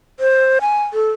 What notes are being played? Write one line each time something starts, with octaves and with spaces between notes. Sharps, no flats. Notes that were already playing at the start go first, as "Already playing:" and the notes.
C5
G#5
A4